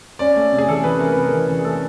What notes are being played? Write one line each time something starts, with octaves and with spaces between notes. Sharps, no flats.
C#4 D5
A3
C3
G#4
E3 A4
C#4 B4
A3 A#4
C3 B4
A#4
E3
C#4
G#4
A3 A4